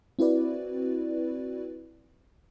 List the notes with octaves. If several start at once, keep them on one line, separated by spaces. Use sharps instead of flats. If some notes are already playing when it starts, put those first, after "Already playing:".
C4 E4 F#4 B4 D5